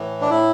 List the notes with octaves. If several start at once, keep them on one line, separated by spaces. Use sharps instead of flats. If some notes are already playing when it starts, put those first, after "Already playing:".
Already playing: A2 E3
D4
A2 E4